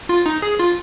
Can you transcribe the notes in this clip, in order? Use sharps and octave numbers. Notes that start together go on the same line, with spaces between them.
F4
D#4
G#4
F4